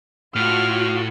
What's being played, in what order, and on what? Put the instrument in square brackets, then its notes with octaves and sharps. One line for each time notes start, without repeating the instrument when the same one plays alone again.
[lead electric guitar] A2 [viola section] F4 F#4 [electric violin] F6